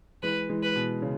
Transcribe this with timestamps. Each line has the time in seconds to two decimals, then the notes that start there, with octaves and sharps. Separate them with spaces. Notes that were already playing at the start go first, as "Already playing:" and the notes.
0.23 E3 G#3 B4
0.49 E3 G#3
0.63 B4
0.76 B2
1.02 C#3